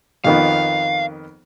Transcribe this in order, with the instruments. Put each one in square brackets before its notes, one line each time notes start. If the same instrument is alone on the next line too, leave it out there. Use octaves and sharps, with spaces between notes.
[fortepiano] F2 D#3 B3 [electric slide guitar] F5